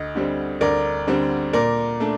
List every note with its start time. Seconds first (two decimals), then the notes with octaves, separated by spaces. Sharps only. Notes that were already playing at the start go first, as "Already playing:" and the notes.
Already playing: D2 D#5
0.15 D3 G3 C4
0.61 D2 A#4 D5
1.07 D3 G3 C4
1.53 A#2 A#4 D5
2.00 A3 D4